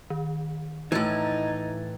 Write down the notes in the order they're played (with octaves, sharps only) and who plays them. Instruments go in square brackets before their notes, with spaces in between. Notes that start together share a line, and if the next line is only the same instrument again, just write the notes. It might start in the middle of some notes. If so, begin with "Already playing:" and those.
[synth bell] D#3
[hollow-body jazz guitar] A2 E3 [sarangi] D#4 [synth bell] A#5 G#6 A6